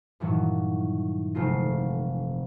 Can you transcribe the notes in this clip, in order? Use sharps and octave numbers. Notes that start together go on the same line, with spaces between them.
G2 A#2 D#3 E3 F#3
F1 C3 G#3 A3 F4 C7